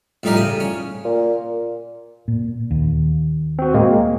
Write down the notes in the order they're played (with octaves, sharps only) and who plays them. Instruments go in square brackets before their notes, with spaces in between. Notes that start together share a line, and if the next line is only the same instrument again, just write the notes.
[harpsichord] A#1 A2 G3 D#4 G4 A#4
C#3 D#6
C#4
[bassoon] A#2
[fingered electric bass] A#2
D#2
[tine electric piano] C4 F#4
[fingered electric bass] A#2 [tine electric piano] G#3 A#3